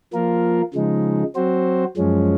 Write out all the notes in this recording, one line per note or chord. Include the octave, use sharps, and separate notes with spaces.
F3 A#3 F4 A#4
C#3 F3 G#3 D#4
F#3 C4 F#4 C5
F#2 F3 G#3 C#4